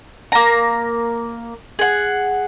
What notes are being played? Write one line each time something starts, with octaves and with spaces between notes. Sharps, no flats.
A#3 A#5
G#4 F#5